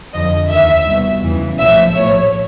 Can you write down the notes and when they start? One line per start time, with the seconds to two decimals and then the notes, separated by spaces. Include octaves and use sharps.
0.13 F2 D3 F3 D#5
0.50 D#2 D#3 E5
0.87 C2 B2
1.23 E2 C#3 E3
1.58 B1 A2 F3 E5
1.95 A#1 A2 F3 C#5